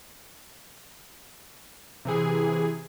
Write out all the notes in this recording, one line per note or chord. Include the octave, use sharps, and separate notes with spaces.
C3 E3 G#4